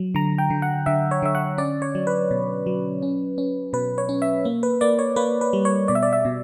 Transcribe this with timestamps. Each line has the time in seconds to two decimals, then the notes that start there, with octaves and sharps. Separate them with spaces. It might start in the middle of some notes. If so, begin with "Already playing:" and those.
Already playing: F#3
0.15 D3 A#5
0.38 G5
0.50 D3
0.62 F#5
0.86 D3 E5
1.11 C#5
1.22 D3 E5
1.35 F#5
1.58 C#4 D5
1.82 C#5
1.95 F#3
2.07 B4
2.31 B2
2.66 F#3
3.02 C#4
3.38 C#4
3.73 B2 B4
3.98 C#5
4.09 C#4
4.22 E5
4.45 A#3
4.63 B4
4.81 A#3 D5
4.99 C#5
5.16 A#3 B4
5.41 B4
5.53 G3
5.65 C#5
5.88 B2 D5
5.95 E5
6.03 D5
6.13 E5
6.25 B2